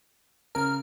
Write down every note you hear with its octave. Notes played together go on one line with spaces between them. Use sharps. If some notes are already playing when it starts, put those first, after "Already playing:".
C#3 A#4 F6